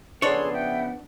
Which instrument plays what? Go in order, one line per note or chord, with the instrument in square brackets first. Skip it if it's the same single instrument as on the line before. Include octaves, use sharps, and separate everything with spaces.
[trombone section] C#3 F3 B3 [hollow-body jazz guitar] D4 C#5 [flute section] G#4 A4 C6
[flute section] E5 F#5 G5